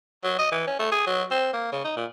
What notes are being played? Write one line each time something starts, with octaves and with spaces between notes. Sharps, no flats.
F#3
D#5
E3
C#4
A3
G#4
F#3
C4
A#3
C#3
D#4
A#2